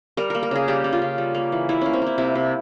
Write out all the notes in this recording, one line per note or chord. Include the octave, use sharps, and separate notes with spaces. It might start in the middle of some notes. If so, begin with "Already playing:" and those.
G3 A#4
A#3 A#4
A#4
C#3 G#4
G3 G4
C#3
F4
C#3
G3
A#3
E3
G3 E4
A#3 C#4
C4
A#3 E4
C3 E4
C3